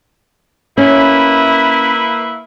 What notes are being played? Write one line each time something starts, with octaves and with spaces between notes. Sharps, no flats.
A#3 C#4 E4 B4